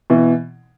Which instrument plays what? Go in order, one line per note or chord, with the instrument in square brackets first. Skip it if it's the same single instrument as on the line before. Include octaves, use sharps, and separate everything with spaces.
[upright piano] B2 E3